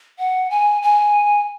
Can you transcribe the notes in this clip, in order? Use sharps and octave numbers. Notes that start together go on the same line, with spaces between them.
F#5
G#5
G#5